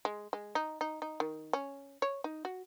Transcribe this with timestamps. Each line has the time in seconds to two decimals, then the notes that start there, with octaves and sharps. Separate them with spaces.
0.05 G#3
0.33 G#3
0.55 D#4
0.81 D#4
1.02 D#4
1.20 D#3
1.53 C#4
2.02 C#5
2.24 D#4
2.45 F#4